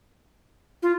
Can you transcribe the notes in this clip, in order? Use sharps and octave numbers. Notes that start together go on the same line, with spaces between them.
F4